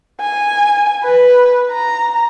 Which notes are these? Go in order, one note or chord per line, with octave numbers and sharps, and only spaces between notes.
G#5
B4
A#5